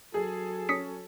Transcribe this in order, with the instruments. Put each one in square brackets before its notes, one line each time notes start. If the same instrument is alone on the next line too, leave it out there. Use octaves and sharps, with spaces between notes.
[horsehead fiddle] F#3 A4 [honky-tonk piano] G#4
[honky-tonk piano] C#4 [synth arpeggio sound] D#6 B6 C#7